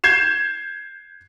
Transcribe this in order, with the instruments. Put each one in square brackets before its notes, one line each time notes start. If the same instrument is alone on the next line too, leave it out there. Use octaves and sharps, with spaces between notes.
[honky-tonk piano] G6 G#6 C7 E7